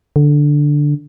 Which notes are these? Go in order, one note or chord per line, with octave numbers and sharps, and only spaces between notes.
D3